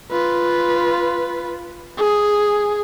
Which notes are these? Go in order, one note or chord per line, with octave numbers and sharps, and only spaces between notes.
F4 B4
G#4